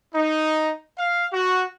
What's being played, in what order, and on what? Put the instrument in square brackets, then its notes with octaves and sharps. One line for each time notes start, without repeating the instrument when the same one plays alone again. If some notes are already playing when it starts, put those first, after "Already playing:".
[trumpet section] D#4
F5
F#4